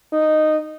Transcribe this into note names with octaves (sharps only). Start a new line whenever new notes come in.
D#4